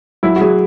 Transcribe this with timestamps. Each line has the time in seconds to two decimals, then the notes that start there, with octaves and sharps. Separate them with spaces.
0.23 F#3 E4
0.36 F#4
0.41 F#3 G#4